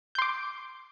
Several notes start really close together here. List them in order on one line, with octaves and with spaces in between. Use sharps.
G6 C6 D6